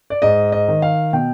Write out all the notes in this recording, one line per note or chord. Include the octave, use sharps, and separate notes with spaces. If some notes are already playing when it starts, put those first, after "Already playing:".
D5
G#2 D#5
D#5
D#3
F5
B2 G5